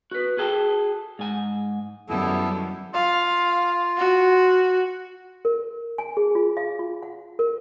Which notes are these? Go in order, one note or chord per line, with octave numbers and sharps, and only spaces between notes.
F#4 B4
F#4 G#4 A4 G5
G#2 G#5
F#2 D#3 G3 B3 E4 A4
F4 F5
F#4
A#4
G#5
G#4
F4
F5
F4
F#5
A#4